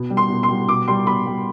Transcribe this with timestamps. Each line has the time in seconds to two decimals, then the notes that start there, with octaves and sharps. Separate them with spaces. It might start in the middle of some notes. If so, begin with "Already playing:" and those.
Already playing: B2
0.10 G3
0.17 C6
0.29 B2
0.43 C6
0.49 G3
0.68 B2 D6
0.88 G3 C6
1.07 B2 B5
1.26 G3